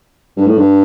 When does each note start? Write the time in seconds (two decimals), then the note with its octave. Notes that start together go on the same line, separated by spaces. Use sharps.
0.37 G2
0.47 A2
0.57 G2